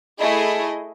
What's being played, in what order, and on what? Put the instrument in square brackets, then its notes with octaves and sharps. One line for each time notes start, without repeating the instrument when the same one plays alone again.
[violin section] A3 E4 G#4 D#5